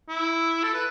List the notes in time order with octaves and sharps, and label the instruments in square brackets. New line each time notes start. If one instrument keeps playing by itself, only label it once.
[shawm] E4
A4
B4